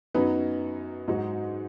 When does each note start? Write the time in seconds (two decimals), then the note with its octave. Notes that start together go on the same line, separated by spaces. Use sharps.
0.14 F#2 F#3 B3 D#4 B4
1.08 G#2 F#3 D#4 F#4